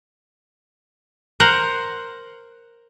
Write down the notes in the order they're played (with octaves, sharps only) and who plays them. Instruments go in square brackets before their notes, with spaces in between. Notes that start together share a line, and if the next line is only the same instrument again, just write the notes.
[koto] A#4 C5 F#5